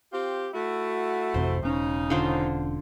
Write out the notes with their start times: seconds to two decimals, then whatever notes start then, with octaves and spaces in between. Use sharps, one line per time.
0.13 C4 F4 G4
0.53 A3 E4 F#4
1.34 A1 F2 C3 C5
1.63 E1 C#3 C#4 D#4
2.10 D3 F4 C5